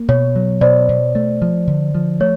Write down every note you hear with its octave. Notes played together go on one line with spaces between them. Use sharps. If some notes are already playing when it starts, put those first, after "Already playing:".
Already playing: A#3
B2 C#5
F#3
B2 C5 D5
B2
A3
F3
D3
F3
A3 C#5